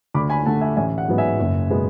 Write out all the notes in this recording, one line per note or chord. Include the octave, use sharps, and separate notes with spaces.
D2 B5 D6
G#5 B5
D3 A3 F#5 A5
E5 G#5
A1 E5 G#5
F#5
G#2 F#3 B3
E5 G#5
F#1
B2 G#3 B3